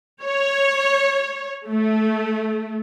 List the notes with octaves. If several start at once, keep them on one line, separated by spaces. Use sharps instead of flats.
C#5
A3